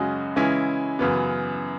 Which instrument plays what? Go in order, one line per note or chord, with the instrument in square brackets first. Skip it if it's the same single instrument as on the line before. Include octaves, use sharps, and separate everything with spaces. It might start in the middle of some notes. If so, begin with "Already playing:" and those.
Already playing: [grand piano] F#2 C#3 G#3 C#4 F#4
C#3 E3 G#3 C#4 E4
F#2 C#3 E3 B3